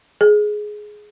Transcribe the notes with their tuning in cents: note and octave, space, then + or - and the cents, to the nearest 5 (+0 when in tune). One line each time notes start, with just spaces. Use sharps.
G#4 +10